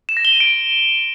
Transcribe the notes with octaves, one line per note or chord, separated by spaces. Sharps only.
E7
A#6
G7
D#7
D7